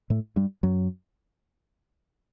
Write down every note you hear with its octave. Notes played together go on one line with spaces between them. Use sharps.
A2 A3
G2 G3
F#2 F#3